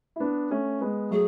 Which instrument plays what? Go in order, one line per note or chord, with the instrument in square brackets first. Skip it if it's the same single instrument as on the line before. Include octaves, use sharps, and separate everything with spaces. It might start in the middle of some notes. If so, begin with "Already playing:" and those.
[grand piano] E4
B3 D4
A3 C#4
G#3 B3
[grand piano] F#3 A3 [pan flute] G#4